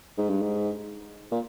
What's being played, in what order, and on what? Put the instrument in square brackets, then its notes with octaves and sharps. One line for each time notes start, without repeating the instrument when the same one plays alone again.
[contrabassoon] G#2
G2
G#2
A#2